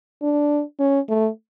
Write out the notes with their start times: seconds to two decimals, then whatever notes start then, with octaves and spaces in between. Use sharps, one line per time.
0.22 D4
0.80 C#4
1.09 A3